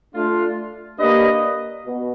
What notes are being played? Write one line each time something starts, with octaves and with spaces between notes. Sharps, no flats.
A3 D4 F4
A#3 D4 G4 B4 D#5
B2